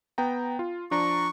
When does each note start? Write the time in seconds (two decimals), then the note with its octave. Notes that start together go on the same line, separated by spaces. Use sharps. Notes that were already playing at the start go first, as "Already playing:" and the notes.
0.18 B3 G5 A#5
0.59 F4
0.91 F3 D4 A#5 C#6